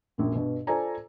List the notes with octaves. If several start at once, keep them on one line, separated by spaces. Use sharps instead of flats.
A#1 F#2 A#2
G2 B2
F4 A4 C5 D5 G#5 A#5